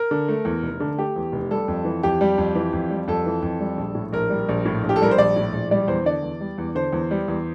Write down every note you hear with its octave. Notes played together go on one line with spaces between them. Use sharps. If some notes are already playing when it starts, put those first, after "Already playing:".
Already playing: A#4
D3
A3
E2
F1
D3
A3 G4
E2
F1
G3 A4
F2
E3
F2 G4
G3
F2
E3
F2
G3
F2 A4
E3
F2
G3
A#1
A2
A#1 A#4
G3
A#1
A2
A#1
G4
A4
G3 A#4
C5
A#1 D5
A2
A#1
G3 D5
E2 C5
D3 D5
E2
G3
E2
D3 C5
E2
G3
E2